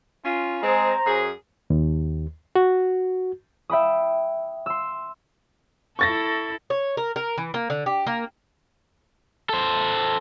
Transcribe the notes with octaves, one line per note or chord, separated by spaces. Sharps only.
C#4 F4
G#3 C4 G#4 C5 A#5
F#2 G#4
D#2
F#4
E5 G5 B5 D#6
C6 E6
E4 A4 C#6 A6 A#6
C#5
A#4
A#4
E3
A#3
D3
G4
A#3
A4 C5